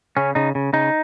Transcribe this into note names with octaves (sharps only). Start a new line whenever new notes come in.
C#3 C#4
C#3 D#4
C#3
C#3 D#4